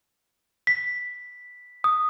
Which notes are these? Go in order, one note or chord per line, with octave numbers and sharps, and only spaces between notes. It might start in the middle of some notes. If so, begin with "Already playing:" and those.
B6
D#6